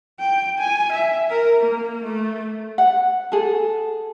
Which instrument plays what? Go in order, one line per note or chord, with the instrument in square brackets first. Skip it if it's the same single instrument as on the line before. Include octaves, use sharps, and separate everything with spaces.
[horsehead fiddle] G5
G#5
E5
A#4
A#3
A3
[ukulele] F#5
G#4 A4